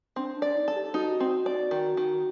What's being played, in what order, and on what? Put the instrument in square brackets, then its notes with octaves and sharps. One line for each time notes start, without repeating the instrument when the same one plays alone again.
[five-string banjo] C4 [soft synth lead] D4
[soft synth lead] D4
[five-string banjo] D5
[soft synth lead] D#4
[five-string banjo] A4
[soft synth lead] G4
[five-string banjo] D#4 [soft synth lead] F#4
[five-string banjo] C4
D5
D#3
D#3